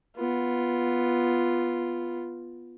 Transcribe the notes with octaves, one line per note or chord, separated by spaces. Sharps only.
B3 F4